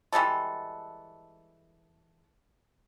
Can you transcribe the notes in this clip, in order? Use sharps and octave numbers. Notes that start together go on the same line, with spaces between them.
E3 G3 G#3 A4